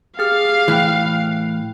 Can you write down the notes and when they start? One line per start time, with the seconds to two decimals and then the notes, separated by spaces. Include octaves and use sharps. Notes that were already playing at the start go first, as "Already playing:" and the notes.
0.19 G4 G#4 F5 F6
0.68 A2 E3 G5 F#6